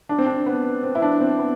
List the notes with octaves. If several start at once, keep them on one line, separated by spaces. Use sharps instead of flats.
D4
C4
D4
B3
C4
E4
D4
C4
B3